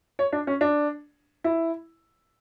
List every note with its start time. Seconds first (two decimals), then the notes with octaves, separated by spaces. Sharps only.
0.19 C#5
0.33 D4
0.47 C#4
0.61 D4
1.44 E4